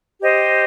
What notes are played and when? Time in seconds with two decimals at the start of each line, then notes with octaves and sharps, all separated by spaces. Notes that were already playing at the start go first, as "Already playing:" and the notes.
0.21 G4 C5 D#5